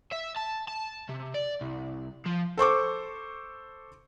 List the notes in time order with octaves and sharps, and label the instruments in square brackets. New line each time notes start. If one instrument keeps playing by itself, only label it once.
[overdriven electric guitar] E5
A5
A5
C3
D5
C2
F3
[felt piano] A4 C5 C#6 D6